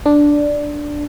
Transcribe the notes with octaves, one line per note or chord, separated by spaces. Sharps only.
D4